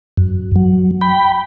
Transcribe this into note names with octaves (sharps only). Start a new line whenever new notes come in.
F#2
F#3
G5 B5